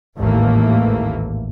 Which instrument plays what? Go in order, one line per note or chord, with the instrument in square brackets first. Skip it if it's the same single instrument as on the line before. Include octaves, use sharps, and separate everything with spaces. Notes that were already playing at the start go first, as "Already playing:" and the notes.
[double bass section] A1 D#2 G#2 E3 A3 A#3